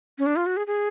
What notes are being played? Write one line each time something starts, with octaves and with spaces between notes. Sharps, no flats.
C#4
D4
F4
F#4
G#4
G#4